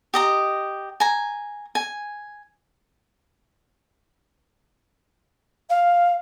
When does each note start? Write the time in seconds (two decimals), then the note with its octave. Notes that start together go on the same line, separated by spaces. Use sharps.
0.14 G4 D#5 A#5
1.00 G#5 A#5
1.75 G#5
5.69 F5